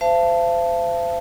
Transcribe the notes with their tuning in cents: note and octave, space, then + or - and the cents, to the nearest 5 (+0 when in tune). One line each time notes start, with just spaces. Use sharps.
C5 -30 F5 -45 A5 +0